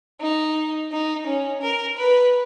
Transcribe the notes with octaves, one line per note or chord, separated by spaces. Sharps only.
D#4
D#4
C#4
A#4
B4